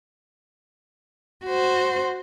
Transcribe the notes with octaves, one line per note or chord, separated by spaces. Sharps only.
F#4 C5